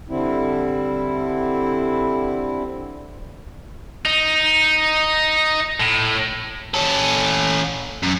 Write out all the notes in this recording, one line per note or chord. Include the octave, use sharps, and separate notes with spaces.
D3 G3 C4 E4
D#4
A2
C#4 A4
F#2